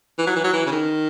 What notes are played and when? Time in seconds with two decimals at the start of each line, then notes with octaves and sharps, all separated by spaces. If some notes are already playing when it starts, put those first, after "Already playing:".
0.18 E3
0.27 F#3
0.36 E3
0.44 F#3
0.53 E3
0.66 C#3
0.72 D#3